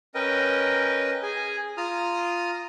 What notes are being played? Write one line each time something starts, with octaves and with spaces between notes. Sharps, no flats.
C#4 A#4 B4 D#5 G5
G#4 G#5
F4 A#5 D#6 F6